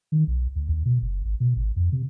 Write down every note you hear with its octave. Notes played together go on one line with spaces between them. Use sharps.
D#3
B1
D2
D#2
B2
F#1
G#1
B2
G#1
F2
C3